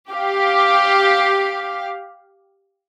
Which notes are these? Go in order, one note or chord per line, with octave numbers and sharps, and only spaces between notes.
G4 F5